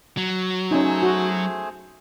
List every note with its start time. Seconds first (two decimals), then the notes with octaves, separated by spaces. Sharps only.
0.17 F#3
0.71 A3 C#4 D#4 G#4 C5
1.03 F#4